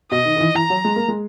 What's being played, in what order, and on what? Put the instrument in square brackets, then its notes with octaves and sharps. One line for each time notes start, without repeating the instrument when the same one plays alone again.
[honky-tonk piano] B2 [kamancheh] D#5
[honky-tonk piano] D#3
D#3
E3
[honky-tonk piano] E3 [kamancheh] A#5
[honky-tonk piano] F#3
G#3
A#3
G#3